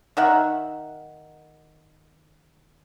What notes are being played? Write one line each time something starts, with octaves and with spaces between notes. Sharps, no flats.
D#3 E5 F#5